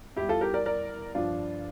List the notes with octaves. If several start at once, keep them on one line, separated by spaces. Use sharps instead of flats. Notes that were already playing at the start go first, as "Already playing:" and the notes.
E2 E3 G3 E4 G4
F4 A4
G4 A#4
A#4 D5
A#4 D5
G2 F3 D4 F4